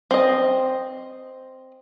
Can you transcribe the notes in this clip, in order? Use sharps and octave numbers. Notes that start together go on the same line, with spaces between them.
C4 D#5